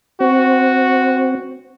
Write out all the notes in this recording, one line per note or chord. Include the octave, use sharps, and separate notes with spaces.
C4 F#4